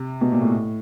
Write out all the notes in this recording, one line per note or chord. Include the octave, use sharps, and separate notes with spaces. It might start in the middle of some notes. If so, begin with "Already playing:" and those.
Already playing: C3
B2
A#2
A2